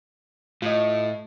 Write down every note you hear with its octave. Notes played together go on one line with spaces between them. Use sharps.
A2 F4 D#5